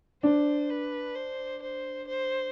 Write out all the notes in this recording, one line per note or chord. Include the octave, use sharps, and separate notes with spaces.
D4 C5
B4
C5
C5
C5